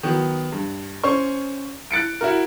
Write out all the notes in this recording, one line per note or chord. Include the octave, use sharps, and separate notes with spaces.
D#3 F#3 B3
G2
C#4 C5 C6 C#6
F#6 A6 C#7 D7
E4 F#4 A#4